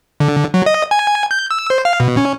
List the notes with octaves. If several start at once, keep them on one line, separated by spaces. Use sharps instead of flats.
D3
F#3
D#5
G#5
G6
E6
C5
F5
B2
C#4